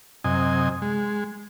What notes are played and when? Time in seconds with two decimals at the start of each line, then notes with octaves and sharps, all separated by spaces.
0.24 F#2 C3 D#5 G#5
0.82 G#3